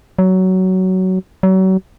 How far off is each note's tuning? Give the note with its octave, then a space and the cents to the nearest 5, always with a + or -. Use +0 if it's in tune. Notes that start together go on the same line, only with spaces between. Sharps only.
F#3 +15
F#3 +35